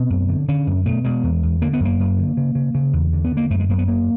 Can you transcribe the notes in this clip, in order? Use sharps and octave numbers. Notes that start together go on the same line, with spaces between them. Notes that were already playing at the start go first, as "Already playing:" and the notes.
Already playing: B2 C4
F#2
D3
D3 C#4
F#2
B2 A3
B2 G#3
E2
E2
D3 A#3
B3
F#2 A#3
F#2
D3
C#3
C#3
C#3
E2
D3
B3
D3
A#3
F#2 A3
G#3
F#2 A#3
B3
G2 A#3